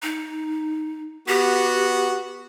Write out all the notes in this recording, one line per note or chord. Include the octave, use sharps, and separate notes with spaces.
D#4
B3 F#4 G4